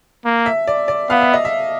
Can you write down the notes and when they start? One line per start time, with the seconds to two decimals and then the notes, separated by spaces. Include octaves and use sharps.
0.25 A#3
0.46 E5
0.67 D5
0.88 D5
1.10 B3 F5
1.21 E5
1.34 D#5
1.45 E5